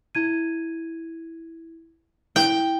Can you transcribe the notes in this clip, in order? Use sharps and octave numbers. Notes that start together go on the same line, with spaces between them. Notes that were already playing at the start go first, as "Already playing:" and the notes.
E4 G#6 D#7
E4 G5